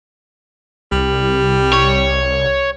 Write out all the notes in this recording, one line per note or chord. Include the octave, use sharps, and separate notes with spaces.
C2 G3
C#5